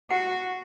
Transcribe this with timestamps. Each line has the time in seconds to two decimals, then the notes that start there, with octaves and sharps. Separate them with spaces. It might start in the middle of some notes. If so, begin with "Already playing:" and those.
0.10 F#4 F#5